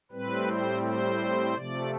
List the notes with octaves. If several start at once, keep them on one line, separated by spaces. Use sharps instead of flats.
A2 G3 C4 B4
C5
C5
C3 F3 A3 D5